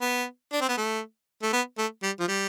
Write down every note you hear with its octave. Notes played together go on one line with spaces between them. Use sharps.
B3
D4
C4
B3
A3
A3
B3
A3
G3
F3
G3